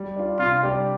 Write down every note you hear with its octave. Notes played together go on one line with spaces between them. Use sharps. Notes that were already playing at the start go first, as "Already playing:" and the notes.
Already playing: G3
D4 F4
C3 F4
G3 D4 G4 D5